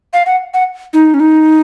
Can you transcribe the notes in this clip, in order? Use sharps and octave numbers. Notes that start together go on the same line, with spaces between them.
F5
F#5
F#5
D#4
C#4
D#4